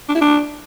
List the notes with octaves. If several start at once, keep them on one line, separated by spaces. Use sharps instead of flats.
D4
E4
D4